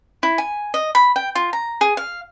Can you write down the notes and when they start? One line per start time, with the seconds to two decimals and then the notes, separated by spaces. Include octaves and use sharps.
0.23 E4
0.38 G#5
0.74 D#5
0.95 B5
1.16 G5
1.35 F4
1.53 A#5
1.81 G#4
1.97 F5